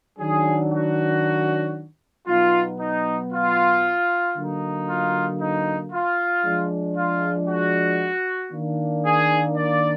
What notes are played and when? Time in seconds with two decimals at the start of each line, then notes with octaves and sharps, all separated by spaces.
0.19 D#3 F#3 D4 G#4
0.71 F#4
2.27 B2 F#3 B3 D#4 F4
2.79 D#4
3.31 F4
4.35 D3 F#3 A#3 D#4
4.87 F4
5.40 D#4
5.92 F4
6.44 F3 G#3 D4
6.96 F4
7.48 F#4
8.52 D#3 A#3 D4
9.05 G#4
9.56 D5